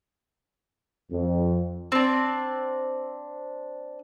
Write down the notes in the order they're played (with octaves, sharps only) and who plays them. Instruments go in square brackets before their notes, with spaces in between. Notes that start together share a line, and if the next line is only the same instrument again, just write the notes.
[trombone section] F2
[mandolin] C4 D4